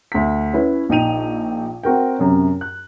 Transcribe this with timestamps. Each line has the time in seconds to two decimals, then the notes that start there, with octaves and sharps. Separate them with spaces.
0.12 D2 B6
0.54 C#4 E4 B4
0.89 A#1 D#4 G5 D#7 F7
1.83 C4 F#4 A#4 G5
2.19 F#2 C3 C#4
2.61 F#6